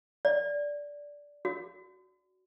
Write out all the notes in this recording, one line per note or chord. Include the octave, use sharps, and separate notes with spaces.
D5
F#4